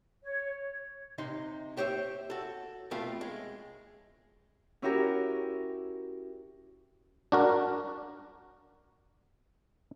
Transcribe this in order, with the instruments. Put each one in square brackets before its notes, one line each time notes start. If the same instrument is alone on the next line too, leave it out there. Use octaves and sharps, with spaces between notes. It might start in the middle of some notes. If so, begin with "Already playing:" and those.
[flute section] C#5
[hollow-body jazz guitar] C3 D#4 C6
G4 C5 C#5 E5
F#4 A4
F2 B2 A3 C4 F4
G#3
[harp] C#4 E4 F#4 G4 A#4
[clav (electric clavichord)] D4 F#4 A#4